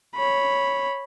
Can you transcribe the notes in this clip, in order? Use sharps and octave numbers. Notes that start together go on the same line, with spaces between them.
C#5 B5